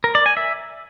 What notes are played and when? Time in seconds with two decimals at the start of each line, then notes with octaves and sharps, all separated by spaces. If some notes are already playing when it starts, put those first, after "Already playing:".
0.04 A#4
0.15 D5
0.26 G#5
0.37 E5